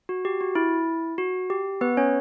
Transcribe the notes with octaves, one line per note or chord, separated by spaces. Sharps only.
F#4
G4
F#4
E4
F#4
G4
B3 B4
C#4 C#5